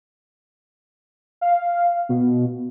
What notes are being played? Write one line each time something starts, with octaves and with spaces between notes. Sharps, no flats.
F5
B2